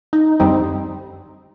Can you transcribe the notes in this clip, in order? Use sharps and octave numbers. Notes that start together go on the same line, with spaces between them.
D#4
F#2 D3 G3 C4 D#4